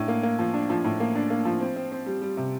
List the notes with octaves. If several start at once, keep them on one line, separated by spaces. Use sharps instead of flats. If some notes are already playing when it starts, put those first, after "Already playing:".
Already playing: A2 D4
A#3
A#3
F3
D4
F3
A2
A#3
D4
A#3
F3
C4
C4
C4
G3
G3
C3